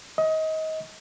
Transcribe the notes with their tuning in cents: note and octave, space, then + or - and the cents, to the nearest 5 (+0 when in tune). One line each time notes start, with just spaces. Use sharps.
D#5 +25